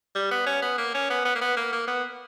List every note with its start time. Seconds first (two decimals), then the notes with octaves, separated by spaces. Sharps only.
0.15 G3
0.31 B3
0.47 C#4
0.62 B3
0.78 A#3
0.94 C#4
1.10 B3
1.25 B3
1.35 A#3
1.41 B3
1.57 A#3
1.72 A#3
1.87 B3